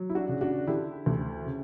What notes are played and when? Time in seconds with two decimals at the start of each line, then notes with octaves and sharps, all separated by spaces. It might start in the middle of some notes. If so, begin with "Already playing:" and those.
Already playing: F#3
0.10 E4
0.15 D4 F#4
0.29 C#3
0.41 D4 F#4
0.67 D3 E4 G4
1.06 D2
1.46 C#3